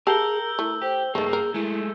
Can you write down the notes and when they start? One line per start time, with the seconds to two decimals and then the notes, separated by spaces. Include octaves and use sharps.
0.07 G4 G#4 A#4 F5 A5 E6 G6 G7
0.59 A3 E4
0.82 G4 C5
1.15 G2 D#3 A3 A#3 G#4
1.33 A#4
1.54 G#3 A3 E4